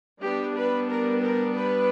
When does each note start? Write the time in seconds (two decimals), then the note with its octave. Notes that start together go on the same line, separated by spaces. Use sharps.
0.21 G3 B3 D4 G4
0.56 B4
0.89 A#4
1.22 A#4
1.56 B4